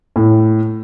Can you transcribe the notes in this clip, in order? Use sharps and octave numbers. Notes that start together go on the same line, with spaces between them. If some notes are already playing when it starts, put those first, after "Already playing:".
A2